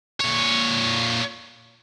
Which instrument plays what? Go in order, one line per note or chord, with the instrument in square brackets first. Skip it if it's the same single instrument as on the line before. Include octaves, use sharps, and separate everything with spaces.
[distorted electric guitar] A#2 C#5